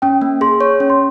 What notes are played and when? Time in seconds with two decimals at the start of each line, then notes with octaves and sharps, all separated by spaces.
0.02 C#4 G5
0.21 A#3
0.41 G#4 C6
0.60 C#5 C#6
0.80 C#4
0.90 C6